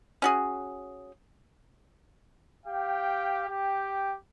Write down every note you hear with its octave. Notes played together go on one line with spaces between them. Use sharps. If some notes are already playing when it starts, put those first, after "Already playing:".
C#4 F#4 G#4
G4 F5 G5
G4 G5